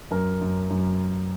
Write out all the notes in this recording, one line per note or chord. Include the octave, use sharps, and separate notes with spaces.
F#2 A#4
F#2
F#2